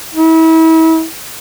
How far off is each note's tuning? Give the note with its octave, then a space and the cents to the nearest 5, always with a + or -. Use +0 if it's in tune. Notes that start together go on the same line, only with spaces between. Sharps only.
E4 -35